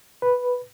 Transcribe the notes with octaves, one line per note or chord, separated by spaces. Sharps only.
B4